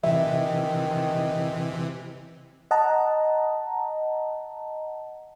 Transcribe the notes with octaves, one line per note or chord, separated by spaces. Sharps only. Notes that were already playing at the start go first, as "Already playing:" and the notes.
C3 D#3 E3 E5
D#5 F#5 A5 A#5